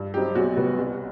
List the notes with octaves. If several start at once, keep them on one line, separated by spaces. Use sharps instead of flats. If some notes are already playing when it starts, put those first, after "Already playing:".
Already playing: G2
F#3 C4 D#4 G4
B1 F#4
B2 G3 B3
C2